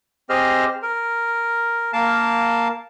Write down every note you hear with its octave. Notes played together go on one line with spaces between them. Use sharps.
C4 G4 G#4 C5 D#5 F6
A#4
A#3 A#4 F5 A5